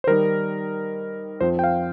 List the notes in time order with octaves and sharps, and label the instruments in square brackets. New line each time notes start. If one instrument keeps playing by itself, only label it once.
[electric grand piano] C5
D#3 G3 D#4 A#4
F2 F3 C4 C5
G5
F5